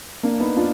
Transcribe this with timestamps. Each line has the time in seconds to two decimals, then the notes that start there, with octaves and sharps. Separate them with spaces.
0.23 A#3 D4
0.40 B3 D#4
0.57 D4 F4